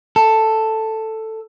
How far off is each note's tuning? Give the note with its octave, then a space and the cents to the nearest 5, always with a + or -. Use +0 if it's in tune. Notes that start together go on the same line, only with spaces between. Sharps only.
A4 +5